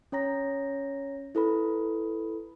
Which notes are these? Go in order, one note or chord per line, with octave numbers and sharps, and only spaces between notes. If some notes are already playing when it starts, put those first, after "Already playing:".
C#4 C#5 A#5 A#6
E4 A4 B4 B5